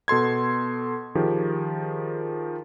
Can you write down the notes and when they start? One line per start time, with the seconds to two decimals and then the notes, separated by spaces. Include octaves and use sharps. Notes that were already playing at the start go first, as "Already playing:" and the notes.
0.08 B2 A4 C6 G#6
1.15 D#3 F3 G4 G#4